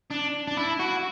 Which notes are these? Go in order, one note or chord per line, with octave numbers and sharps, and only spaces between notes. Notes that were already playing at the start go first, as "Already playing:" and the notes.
D4
D4
E4
F#4